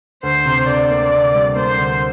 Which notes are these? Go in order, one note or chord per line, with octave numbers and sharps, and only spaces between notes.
D2 C5
C3
D2 D5
A#3
C3
G3
A#3 C5
D2